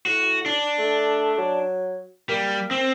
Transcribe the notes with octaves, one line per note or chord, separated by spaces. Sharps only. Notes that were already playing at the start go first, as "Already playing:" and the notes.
A2 F#4
D4
A3
F#3
G3 A#3
C4